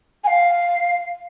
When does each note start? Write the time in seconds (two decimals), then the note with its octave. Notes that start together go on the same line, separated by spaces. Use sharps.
0.24 G#5
0.27 F5